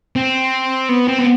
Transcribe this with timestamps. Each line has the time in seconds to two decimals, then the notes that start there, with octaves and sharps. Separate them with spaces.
0.16 C4
0.89 B3
1.08 C4
1.19 B3